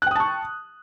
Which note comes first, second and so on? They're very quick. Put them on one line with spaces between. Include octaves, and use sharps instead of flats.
F#6 G5 D#6 A5 C#6